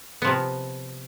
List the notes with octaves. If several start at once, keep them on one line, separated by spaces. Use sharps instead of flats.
C3 F3 B3